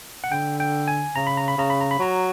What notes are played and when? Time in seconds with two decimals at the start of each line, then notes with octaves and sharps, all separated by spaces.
0.24 F#5
0.32 D3 G5
0.60 G5
0.88 G#5
1.16 C#3 A#5
1.27 B5
1.37 A#5
1.48 B5
1.57 C#3 A#5
1.70 B5
1.81 A#5
1.91 B5
1.99 F#3 A#5